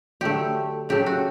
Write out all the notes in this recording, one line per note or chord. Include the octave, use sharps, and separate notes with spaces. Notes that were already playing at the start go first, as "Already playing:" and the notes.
D3 F#3 A3 G4
C#3 F#3 A3 G4
F#4